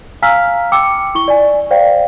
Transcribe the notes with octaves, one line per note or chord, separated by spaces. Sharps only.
F5 G#5 A#5 E6 F6 B6
G5 D6 E6 C#7
E4 C#6 G7
D5 G#5
C5 D5 F5 G5